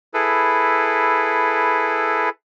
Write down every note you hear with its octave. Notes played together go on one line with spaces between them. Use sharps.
E4 G#4 A4 B4